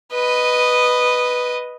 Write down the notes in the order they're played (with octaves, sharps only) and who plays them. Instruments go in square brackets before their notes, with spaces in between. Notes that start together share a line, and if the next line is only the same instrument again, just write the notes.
[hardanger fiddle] B4 D#5